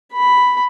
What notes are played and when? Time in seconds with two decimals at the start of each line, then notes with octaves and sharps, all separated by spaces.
0.13 B5